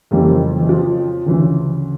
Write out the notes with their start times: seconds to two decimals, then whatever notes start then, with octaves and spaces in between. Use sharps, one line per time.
0.11 F2 C#3 E3 G3 A#3
0.60 E3
0.69 F3
1.26 D2 C#3 E3